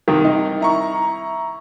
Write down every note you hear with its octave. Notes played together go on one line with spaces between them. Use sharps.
C2 D#3
D#4
E4 A#5 C#6